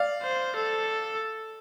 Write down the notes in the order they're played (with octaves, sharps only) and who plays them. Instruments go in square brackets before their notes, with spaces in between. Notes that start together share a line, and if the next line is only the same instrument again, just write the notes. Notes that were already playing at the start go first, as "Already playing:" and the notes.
Already playing: [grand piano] D5 F5
[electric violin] C5
A4